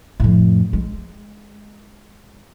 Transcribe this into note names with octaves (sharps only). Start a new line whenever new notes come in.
F2 A2
G#3